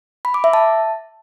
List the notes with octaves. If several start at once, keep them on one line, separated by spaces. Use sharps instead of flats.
B5
D6
E5
A5